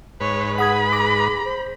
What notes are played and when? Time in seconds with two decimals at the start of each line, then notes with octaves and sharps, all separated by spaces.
0.20 G#2 B4 C#5
0.58 G#4 F#5 B5 D#6 G#6
0.92 D6 A#6
1.45 C5